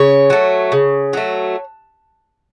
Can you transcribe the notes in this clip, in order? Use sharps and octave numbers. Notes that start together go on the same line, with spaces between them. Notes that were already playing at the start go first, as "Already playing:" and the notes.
Already playing: C#3 C#5
F#3 A3
C#3
F#3 A3